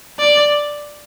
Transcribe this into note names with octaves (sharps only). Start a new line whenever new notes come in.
D5